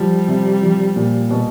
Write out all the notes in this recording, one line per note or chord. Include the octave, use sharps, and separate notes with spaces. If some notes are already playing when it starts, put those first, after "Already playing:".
Already playing: F3 G3
C3
F3
A#2
B2